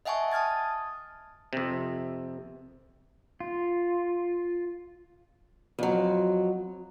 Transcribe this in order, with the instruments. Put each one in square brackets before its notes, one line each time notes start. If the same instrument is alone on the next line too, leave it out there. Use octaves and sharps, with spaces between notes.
[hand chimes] D#5 E5 F#5 G#5 A5 C#6
A5 D#6 F6 G#6 A6
[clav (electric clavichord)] F2 C3
[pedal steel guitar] F4
[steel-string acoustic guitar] F2 F#3